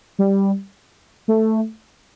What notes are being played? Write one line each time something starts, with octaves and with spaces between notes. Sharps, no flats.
G3
A3